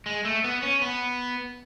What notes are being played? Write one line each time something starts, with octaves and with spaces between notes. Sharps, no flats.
G#3
A3
B3
C#4
B3